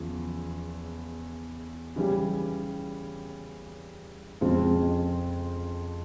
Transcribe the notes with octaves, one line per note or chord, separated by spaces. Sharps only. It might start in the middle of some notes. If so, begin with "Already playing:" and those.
Already playing: E2 C#3 F3
C#3 E3 G3 C#4 G4
F2 C#3 F3 G#3 C4